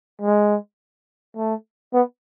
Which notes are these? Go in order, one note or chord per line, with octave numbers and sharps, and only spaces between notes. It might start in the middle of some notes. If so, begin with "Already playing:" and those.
G#3
A3
B3